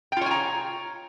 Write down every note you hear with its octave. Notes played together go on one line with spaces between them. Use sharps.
F4 C#5 G5 G#5 A#5